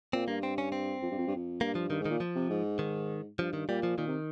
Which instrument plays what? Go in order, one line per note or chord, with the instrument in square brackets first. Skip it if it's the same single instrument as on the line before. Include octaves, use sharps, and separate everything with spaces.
[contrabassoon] A#2 [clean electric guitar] C4
[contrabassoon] G2 [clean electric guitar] A#3
[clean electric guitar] C4
C#4
C4
[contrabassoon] F2
G2
F2
G2
F2
[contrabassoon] G2 [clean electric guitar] A#3
[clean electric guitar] F3
[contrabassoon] G2 [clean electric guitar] D#3
[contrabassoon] G#2
[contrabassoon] A#2 [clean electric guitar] D#3
[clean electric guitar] F3
[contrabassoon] C3
G#2
[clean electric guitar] D#3
[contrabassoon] G2 [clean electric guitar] F3
[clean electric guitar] D#3
[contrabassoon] A#2 [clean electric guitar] G3
[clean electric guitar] F3
[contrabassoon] A#2 [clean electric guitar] D#3
[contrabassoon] C3